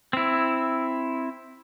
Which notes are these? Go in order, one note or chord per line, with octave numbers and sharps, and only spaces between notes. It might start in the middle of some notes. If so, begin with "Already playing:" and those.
C4 E4